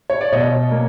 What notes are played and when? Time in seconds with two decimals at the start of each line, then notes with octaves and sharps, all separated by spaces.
0.10 C#5
0.21 D5
0.33 B2 C#5 D#5
0.71 A#3